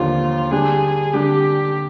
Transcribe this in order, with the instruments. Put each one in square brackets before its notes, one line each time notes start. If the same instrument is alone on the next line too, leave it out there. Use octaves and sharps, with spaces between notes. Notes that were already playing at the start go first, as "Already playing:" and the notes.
Already playing: [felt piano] D#2 D3 F3 [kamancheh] F4
[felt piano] D3 G3 D4 [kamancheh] G#4
[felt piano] D3 G3 D4 [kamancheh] G4